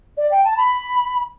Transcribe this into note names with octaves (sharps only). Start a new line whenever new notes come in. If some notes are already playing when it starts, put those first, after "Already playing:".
D5
G5
A5
B5